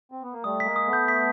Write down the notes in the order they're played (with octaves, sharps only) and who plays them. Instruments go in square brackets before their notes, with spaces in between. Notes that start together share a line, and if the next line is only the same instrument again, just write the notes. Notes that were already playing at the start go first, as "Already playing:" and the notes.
[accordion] C4
B3
A#3
[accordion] G3 A3 [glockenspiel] D#6
[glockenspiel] B6
[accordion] G#3 A#3
[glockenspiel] D#6
[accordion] A3 B3
[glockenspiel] G6
B6